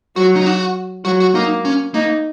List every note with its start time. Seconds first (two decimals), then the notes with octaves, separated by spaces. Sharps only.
0.16 F#3 F#4
0.36 D#4
0.46 F#4
1.05 F#3 F#4
1.20 F#4
1.34 A#3 D#4
1.65 C#4
1.94 A#3 D#4